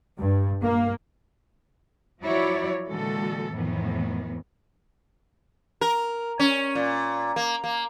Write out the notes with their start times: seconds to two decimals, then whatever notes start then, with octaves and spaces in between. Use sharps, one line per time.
0.18 G2
0.62 A#3
2.20 F3 F#3 E4 F#4 C#5 D5
2.87 A#2 D3 E3 G#3 F#4 A4
3.52 F2 A2 D#3 E3 B3
5.81 A#4
6.39 C#4
6.75 A#2
7.36 A#3
7.64 A#3